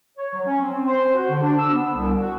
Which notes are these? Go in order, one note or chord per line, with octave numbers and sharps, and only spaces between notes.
C#5
F#3
C#4
C4
C5
F#4
D3
D4
E6
B3
C2
F#4